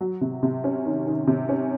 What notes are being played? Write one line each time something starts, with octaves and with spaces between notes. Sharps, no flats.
F#3
C3
C3
C#4
D#3
D#3
C3
C#4